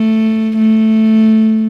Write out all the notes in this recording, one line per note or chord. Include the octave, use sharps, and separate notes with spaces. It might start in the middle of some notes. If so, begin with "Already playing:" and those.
Already playing: A3
A3